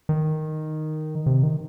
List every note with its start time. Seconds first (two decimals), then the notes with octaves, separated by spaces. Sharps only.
0.09 D#3
1.26 C3
1.43 D#3